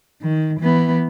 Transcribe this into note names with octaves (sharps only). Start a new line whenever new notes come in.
D#3
E3 B3